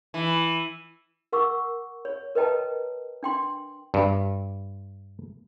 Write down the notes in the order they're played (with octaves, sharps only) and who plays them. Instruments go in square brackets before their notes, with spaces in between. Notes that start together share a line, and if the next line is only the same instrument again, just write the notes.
[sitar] E3
[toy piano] A#4 F#5 C#6 D6 E6
C#5
A#4 B4 D#5 G5 A5 A#5
D4 G5 C6
[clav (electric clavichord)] G2